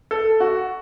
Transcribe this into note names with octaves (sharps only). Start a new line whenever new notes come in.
A4
F#4